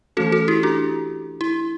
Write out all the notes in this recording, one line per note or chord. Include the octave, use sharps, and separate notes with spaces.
E3 A3 C#4 F#4 A4
F#4 A4
E4 G4
D4 F#4
E4